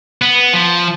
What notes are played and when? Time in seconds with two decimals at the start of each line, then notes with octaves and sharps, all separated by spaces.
0.22 B3
0.53 F3